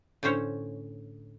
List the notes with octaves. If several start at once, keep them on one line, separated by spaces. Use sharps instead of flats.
A2 D3 C#4 C5 C#5